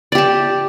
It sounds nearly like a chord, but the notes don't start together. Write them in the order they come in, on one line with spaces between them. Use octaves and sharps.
D5 G4 A5